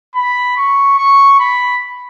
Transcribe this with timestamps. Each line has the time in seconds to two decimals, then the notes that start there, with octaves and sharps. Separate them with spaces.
0.15 B5
0.57 C#6
0.98 C#6
1.39 B5